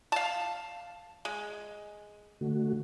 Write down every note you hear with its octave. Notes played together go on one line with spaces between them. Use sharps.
F5 A5
G#3
D3 A3 F#4